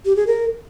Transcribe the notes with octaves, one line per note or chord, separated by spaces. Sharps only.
G4
G#4
A#4